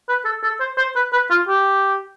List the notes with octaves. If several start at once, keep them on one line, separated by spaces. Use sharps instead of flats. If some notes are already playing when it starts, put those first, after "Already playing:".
B4
A4
A4
C5
C5
B4
B4
F4
G4